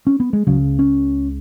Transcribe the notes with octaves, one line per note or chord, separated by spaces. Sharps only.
C#4
B3
G#3
C#2 C#3 F#3
C#4